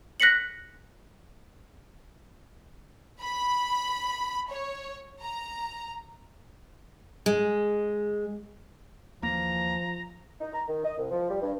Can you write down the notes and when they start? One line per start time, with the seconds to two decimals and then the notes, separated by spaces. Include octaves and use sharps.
0.20 F#6 A#6 B6 C#7 F#7
3.21 B5
4.49 C#5
5.21 A#5
7.26 G#3
9.22 D#2 E3 F3 A#3 A#5
10.41 D#4
10.54 A#5
10.68 D#3
10.85 D#5
10.98 C2
11.11 F3
11.29 G3
11.41 G2